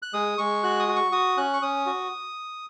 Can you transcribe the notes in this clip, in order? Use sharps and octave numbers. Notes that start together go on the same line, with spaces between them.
F#6
G#3 D#6
G#3 C#6
F#4 F#6
D#6
F#4
C#6
F#4 D#6
C#4 F#6
C#6
C#4 D#6
F#4